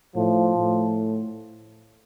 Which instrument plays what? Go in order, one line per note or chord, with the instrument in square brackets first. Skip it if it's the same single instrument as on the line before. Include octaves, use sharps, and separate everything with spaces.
[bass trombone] A2 [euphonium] F3
[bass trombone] A2